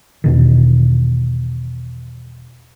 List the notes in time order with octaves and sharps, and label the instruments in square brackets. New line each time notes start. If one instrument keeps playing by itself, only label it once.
[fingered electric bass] E2 B2 D#3